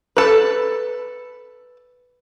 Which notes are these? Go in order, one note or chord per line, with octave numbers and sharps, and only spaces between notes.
A4 B4